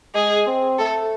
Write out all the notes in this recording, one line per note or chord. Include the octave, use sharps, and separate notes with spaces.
G#3 G#4
C4
A3 A4